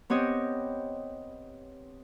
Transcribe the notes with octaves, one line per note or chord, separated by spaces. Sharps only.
B3 C4 G4 C#5 D#5